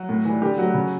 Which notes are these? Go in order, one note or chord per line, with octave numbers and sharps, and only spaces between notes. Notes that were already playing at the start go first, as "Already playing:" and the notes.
Already playing: F#3 F#4
A2
E3 G3
D3 G3 G4
F#3 A3 F#4
C#3